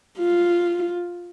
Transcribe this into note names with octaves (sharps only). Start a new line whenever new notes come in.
F4